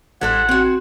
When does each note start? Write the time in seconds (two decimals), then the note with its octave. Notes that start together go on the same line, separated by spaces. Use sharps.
0.21 A1 G3 A4 C5 F#5 F#6 G#6
0.49 C4 F#4